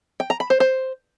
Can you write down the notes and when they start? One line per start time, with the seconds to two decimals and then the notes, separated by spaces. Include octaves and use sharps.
0.20 G5
0.30 A#5
0.40 B5
0.50 C5
0.60 C5